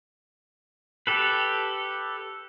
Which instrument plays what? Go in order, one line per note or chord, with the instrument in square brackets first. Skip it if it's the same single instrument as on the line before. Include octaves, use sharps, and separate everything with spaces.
[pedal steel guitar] G4 A4 B4